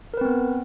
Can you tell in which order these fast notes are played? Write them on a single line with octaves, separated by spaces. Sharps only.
A#4 B4 C4 B3